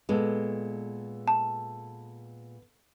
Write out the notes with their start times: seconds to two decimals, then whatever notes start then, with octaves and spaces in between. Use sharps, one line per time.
0.09 A#2 G#3 B3 A4
1.28 A5